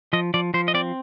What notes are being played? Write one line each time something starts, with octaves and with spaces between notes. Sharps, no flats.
F3 D#5
F3 D5
F3 C5
D#5
C4 D5